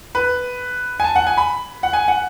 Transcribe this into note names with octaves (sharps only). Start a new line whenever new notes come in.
B4
G#5
A5
F#5
G#5
B5
F#5
G#5
F#5